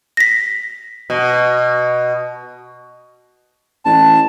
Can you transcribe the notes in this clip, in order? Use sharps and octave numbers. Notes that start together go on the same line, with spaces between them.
A#6 B6
B2
A1 A5